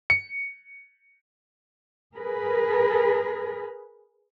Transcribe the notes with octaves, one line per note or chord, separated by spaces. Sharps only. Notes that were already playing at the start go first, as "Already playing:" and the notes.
C#7
G#4 A#4 B4